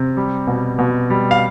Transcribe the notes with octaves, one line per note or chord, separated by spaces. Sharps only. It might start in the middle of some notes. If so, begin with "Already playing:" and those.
Already playing: C3
G3
B2
B2
G3
F5